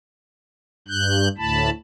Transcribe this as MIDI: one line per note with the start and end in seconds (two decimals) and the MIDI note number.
0.88 1.28 43
0.88 1.28 90
0.88 1.28 91
1.38 1.70 38
1.38 1.70 45
1.38 1.70 81
1.38 1.70 83